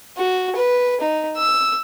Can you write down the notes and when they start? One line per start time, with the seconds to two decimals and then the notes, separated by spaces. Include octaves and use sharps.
0.18 F#4
0.56 B4
1.01 D#4
1.37 E6